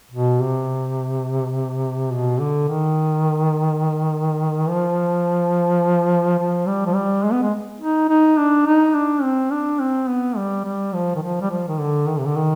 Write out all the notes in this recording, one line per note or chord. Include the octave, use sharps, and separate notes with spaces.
B2
C3
B2
D3
D#3
F3
F3
G3
F3
G3
G#3
B3
G#3
D#4
D#4
D4
D#4
D4
C4
D4
C4
B3
G3
G3
F3
D#3
F3
G3
F3
D#3
D3
D#3
C3
D3
D#3